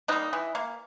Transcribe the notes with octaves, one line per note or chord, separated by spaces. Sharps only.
G3 A#3 B3 D#4
E3
A#3